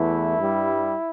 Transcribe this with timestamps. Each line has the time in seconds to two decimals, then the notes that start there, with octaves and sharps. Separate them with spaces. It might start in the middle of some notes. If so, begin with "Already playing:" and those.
Already playing: E2 E3 A3 E4
0.38 G2 G3